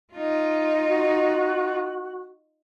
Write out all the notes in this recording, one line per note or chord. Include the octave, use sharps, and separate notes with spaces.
D#4 F4
F#4